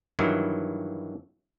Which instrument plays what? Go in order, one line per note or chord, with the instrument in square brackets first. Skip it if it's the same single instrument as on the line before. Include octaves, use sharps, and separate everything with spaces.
[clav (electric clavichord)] G2 D#3 E3 F#3